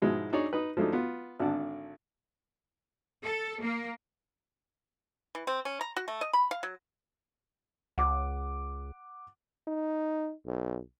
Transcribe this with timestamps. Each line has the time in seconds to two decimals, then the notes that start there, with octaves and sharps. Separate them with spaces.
0.02 G#2 B2 F3 G#3 E4
0.33 D4 D#4 G#4 C#5 D5
0.53 D#4 B4
0.77 F3 G#3 A3 D4 D#4
0.93 B3 F4
1.39 G#1 D3 D4 F#5 A5
3.23 A4
3.61 A#3
5.35 E3
5.47 C4
5.65 C#4
5.81 A#5
5.96 F#4
6.08 A3
6.21 D#5
6.33 B5
6.51 F5
6.63 F#3
7.98 C#2 F#5 D6
9.68 D#4
10.46 B1